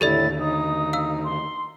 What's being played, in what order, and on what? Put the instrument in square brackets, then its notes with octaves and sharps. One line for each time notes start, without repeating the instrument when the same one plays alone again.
[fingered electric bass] D#2 D3 [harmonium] A2 E4 [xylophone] G4 A4 D5 [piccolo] A6
[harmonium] D#4 [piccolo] D#6
[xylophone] F5 E6
[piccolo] C6